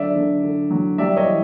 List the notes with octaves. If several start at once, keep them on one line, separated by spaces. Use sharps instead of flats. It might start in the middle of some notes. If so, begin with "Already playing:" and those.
Already playing: D3 F#3 D5 E5
D3
D3
F#3
G3 D5 E5
C#5 D#5
E3